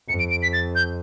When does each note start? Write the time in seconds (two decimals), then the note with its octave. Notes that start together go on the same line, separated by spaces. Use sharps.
0.08 F2 C#7
0.19 D7
0.31 D7
0.43 B6
0.53 A6
0.75 G6